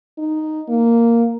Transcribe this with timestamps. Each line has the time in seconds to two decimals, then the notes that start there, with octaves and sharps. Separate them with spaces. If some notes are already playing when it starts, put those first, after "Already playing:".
0.18 D#4
0.69 A#3